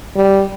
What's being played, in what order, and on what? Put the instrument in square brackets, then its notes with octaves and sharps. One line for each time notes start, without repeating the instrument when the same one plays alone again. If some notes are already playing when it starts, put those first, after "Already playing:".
[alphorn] G3